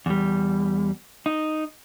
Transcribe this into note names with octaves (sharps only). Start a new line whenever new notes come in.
E2 G3
D#4